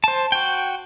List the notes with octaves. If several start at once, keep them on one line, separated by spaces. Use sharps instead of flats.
C5 A5
F#4 G5